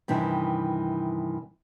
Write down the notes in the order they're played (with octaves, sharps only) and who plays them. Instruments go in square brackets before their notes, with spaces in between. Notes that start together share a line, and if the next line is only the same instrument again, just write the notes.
[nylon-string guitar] G2 C3 D#3 E3